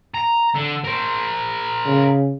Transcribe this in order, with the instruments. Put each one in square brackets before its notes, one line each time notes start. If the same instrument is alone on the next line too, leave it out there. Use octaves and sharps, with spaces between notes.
[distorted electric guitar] A#5
D3
A#4 C5
[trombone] C#3